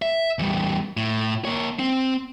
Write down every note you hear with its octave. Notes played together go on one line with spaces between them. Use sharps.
E5
E2 G3
A2
A#3 C#5
C4